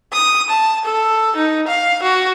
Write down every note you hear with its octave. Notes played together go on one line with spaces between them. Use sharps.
D#6
A5
A4
D#4
F5
F#4